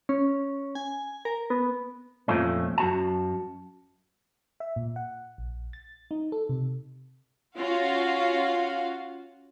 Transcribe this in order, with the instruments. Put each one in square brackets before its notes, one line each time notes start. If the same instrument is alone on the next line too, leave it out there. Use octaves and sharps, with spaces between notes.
[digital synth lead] C#4
G#5
A#4
B3
[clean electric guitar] F2 A#2 D3 F3 A3 C#4
F#2 F#4 A5
[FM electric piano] E5
A#2
F#5
A#1
A6
D#4
A4
C3
[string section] C#4 F4 F#4 F5